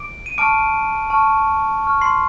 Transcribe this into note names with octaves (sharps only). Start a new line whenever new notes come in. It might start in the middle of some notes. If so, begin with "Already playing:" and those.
Already playing: D6 D7
D#7
A5 C#6 D6 F6 D7
A5 C#6 F6
A5 C#6 F6
C6 C7